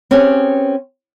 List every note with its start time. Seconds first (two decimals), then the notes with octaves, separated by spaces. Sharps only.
0.11 C4 C#4 G4 G#4 B4 C#5